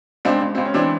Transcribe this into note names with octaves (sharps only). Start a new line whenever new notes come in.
C#2 C4 D4
C#2
C#2 C4
C#4
E3 C4 D4